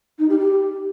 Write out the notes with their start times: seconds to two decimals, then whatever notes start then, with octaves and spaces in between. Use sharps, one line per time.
0.19 D#4
0.29 G4
0.39 G4